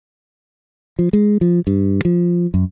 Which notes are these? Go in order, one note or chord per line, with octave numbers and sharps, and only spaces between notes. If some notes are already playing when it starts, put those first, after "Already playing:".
F3
G#3
F3
G2
F3
F#2